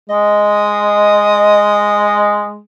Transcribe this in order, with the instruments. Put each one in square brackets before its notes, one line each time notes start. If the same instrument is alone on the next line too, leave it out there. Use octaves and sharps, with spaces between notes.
[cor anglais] G#3 [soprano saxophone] D#5